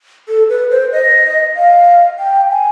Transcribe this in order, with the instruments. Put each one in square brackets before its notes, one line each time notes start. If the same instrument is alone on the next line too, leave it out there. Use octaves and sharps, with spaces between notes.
[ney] A4
B4
C5
D#5
F5
G5
G#5